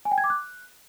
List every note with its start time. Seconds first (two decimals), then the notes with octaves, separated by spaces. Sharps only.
0.05 G#5
0.12 G5
0.18 G#6
0.24 D6
0.30 F#6